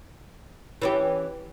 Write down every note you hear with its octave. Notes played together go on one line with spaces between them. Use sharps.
E3 C#4 G4